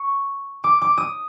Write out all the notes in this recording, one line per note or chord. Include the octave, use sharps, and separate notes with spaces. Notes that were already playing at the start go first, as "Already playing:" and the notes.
Already playing: C#6
D6
D6
D#6